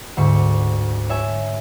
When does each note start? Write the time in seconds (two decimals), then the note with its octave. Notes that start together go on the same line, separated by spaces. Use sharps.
0.17 D2 G#2 C#6
1.09 C#5 E5 G#5